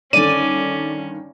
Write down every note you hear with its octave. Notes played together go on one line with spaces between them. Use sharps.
G2 D3 D#3 C#4 D5 D#7